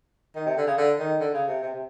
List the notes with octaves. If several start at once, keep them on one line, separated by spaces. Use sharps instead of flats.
D#3
C3
D3
C#3
D3
D#3
D3
C#3
C3
C3
C3